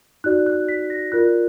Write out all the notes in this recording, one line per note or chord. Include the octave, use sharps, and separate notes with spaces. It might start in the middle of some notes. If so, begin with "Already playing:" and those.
D#4 F#4 D5 F#6
F#6
B6
A#6
F4 A#4 D5 F#6